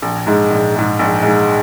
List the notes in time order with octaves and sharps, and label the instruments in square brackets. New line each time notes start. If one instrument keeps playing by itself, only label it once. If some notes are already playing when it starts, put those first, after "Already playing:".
[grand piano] A#1
G#2 G#3
A#1
G#2 G#3
A#1
G#2 G#3